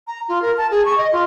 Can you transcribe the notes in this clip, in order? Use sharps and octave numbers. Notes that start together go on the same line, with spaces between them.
A#5
F4
A#4
A5
G#4
C#6
D#5
F4